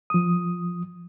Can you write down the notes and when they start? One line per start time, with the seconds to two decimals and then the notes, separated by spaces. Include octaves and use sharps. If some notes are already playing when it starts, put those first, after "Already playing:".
0.10 F3 D#6